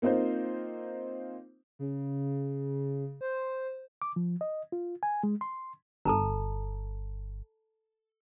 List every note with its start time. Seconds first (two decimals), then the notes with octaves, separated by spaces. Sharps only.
0.02 A#3 C4 D#4 F4 C5
1.79 C#3
3.21 C5
4.02 D6
4.16 F3
4.41 D#5
4.72 F4
5.03 G#5
5.23 G#3
5.41 C6
6.05 G1 A4 A5 A#5